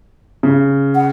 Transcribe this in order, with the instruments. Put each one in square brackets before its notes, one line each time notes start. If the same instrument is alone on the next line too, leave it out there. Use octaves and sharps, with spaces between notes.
[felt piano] C#3
[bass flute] F#5